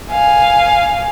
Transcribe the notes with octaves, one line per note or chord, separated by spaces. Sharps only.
F5 G#5